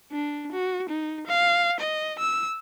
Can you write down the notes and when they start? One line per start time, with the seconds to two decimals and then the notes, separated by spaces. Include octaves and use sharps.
0.12 D4
0.52 F#4
0.89 D#4
1.27 F5
1.80 D#5
2.19 E6